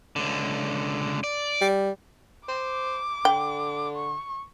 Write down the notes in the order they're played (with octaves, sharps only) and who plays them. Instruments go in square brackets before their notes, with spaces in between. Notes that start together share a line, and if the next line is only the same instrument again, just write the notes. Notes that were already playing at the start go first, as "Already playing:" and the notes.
[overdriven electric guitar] C#2 D3
D5
[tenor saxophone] G3
[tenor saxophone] C5 [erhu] D6
[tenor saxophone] D3 [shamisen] G5
[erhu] C#6